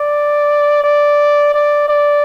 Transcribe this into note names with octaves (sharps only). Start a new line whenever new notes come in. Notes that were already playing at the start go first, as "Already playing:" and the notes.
Already playing: D5
D5
D5
D5